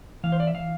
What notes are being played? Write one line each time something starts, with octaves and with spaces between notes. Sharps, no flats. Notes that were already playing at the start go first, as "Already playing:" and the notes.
E3 F5
C5
D5
E5
E3 F5